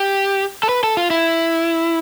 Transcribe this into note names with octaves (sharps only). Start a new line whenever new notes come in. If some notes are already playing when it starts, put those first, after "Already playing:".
Already playing: G4
A4
B4
A4
F4
E4